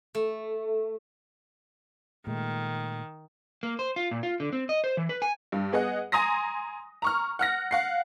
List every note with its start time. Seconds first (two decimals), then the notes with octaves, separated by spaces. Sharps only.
0.15 A3
2.27 A#2 D#3 G#3 A3
3.63 A#3
3.79 C5
3.96 F4
4.11 A#2
4.23 F4
4.40 D3
4.53 C4
4.69 D#5
4.84 C5
4.97 E3
5.09 B4
5.22 G#5
5.52 G2
5.72 B3 G#4 D#5 F#5
6.12 G#5 A#5 C6 D#6 A#6
7.02 A#5 C#6 F6
7.39 F#5 F6 A#6
7.71 F5 F#5 C7